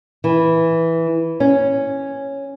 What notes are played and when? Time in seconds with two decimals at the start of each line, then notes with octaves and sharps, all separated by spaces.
0.24 E3
1.40 C#4